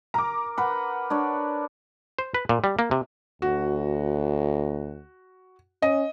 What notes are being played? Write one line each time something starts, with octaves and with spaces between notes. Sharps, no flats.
A#4 A#5 D6
A#4 B4 F#5
D4 C#5 D5
C5
B4
A#2
G3
A#3
C3
D2 F#4
C#4 D#5